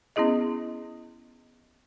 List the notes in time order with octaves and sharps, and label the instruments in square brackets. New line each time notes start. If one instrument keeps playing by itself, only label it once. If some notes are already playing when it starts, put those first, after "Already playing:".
[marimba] B3 C#4 E4 G#4 D#5